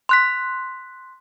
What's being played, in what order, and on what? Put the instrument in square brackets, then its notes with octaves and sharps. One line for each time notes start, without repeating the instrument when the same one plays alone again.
[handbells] C6 F#6 B6